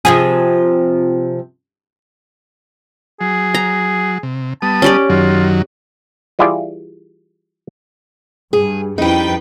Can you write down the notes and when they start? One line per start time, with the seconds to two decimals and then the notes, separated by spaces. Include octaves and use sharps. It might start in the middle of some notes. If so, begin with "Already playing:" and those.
0.05 C3 F3 G#4
3.21 F#3 G#4
3.54 A#5
4.23 C3
4.62 G3 B3 A5 D#6
4.82 C#4 G4 D5
5.09 F#2 D#3 F#3 F4
6.39 E3 G3 E4 F4 G#4 D5
8.53 G2 G#4
8.98 F2 G3 C#4 D#4 E4 B4 G5